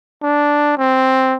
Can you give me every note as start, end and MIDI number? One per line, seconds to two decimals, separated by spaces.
0.23 0.77 62
0.78 1.36 60